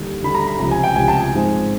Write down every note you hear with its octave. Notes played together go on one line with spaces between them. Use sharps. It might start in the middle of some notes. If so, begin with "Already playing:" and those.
Already playing: D#2 D3 G3
D#2 D3 G3 B5
A#5
B5
C#2 C3 F3 A#5
G#5
G5
C#2 C3 F3 G#5
A5
G#5
G#2 F3 G#3 C4